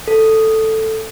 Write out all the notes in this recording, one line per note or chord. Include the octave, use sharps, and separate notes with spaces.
A4